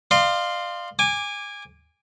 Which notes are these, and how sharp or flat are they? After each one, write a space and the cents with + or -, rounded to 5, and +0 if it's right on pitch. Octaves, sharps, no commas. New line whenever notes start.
D5 +45 F5 +0 C6 +0
G#5 -20 D6 +0